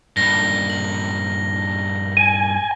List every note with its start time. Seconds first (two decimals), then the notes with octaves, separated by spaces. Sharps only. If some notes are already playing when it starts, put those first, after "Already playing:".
0.17 G2 A#2 A#6 G7
0.70 F#7
2.17 G#5